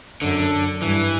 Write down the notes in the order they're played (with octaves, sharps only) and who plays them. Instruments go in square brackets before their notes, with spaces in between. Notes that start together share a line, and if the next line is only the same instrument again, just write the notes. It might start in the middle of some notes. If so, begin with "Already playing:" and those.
[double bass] F#2 [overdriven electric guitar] D3
[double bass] G2 [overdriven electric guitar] E3